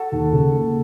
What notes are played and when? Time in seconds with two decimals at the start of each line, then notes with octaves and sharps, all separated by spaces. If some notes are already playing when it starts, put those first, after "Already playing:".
Already playing: F#4 A4
0.12 D#2
0.33 C#3
0.53 A#3